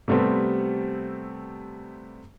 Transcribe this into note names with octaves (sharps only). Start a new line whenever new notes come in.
C3 G3 A3 B3 C4